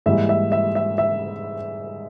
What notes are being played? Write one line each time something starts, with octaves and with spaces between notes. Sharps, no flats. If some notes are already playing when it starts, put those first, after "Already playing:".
G#2 E3 G3 A#3 E5
E5
E5
E5
E5